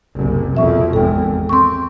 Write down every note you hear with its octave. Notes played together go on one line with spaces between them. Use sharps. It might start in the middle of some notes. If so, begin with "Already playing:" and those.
F#1 C2
F2 B2 F3 E5 C#6
G#1 E2 A4 G5
C4 C6 C#6